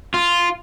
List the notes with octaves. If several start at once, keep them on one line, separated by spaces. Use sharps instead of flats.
F4